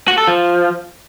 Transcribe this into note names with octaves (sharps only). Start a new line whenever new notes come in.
F#4
A4
F3